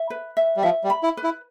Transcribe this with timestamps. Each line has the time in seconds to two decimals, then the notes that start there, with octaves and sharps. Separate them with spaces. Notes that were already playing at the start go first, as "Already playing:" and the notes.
Already playing: E5
0.10 B4
0.37 E5
0.57 G3
0.63 F3 E5
0.84 G3
0.90 B5
1.03 E4
1.17 B4
1.24 E4